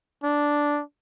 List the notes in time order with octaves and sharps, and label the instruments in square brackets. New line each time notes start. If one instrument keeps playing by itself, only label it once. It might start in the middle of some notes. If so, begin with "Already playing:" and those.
[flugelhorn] D4